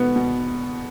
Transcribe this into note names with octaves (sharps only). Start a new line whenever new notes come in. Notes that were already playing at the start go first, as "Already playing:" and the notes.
Already playing: B2 B3
B2